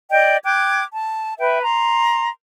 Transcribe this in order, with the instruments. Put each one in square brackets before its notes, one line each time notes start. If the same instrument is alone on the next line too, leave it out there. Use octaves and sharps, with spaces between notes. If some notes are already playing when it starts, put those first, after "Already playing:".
[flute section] D5 D#5 G5
G5 D6 F#6 G#6
A5
B4 E5 G5
A#5 C6